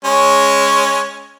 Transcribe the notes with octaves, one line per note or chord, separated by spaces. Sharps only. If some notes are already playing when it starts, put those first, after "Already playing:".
G#3 C#4 C#5